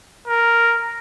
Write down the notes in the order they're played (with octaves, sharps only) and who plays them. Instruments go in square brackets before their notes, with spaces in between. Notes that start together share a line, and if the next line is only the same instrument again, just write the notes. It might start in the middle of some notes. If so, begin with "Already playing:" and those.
[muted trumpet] A#4